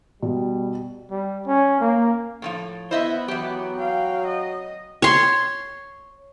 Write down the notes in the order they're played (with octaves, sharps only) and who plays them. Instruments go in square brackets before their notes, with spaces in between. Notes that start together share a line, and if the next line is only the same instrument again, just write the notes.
[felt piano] B2 [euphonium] G3
[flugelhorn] G3
C#4
A#3
[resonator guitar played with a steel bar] A2 D#3 F3
[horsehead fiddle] B3 [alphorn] E4 [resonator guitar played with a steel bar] C5 D#5 E5
[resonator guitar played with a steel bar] E3 G4 [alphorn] F#3
[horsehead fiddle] F5 G5
D#5
[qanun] C#5 C6